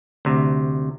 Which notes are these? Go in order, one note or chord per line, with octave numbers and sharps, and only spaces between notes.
D2 C3